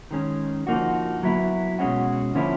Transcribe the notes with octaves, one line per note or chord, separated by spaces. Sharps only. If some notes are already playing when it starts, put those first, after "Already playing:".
D#3 G#3 C#4
D3 F3 A#3 D#4 F#4
F#3 B3 E4
B2 G#3 C#4 F#4
D3 F3 A#3 C#4 E4